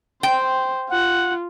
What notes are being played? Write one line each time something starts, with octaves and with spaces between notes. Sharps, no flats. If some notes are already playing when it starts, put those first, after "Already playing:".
C5 G5
F4 F#5